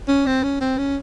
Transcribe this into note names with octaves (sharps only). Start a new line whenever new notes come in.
C#4
C4
C#4
C4
C#4